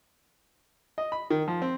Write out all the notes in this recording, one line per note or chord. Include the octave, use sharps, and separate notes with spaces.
D#5
B5
D#3
F3
C4